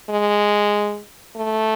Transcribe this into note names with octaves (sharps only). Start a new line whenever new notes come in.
G#3
A3